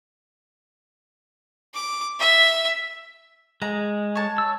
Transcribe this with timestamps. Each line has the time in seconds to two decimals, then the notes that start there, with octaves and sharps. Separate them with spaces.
1.74 D6
2.20 E5
3.62 G#3 A#5
4.15 C#5 A5
4.38 E6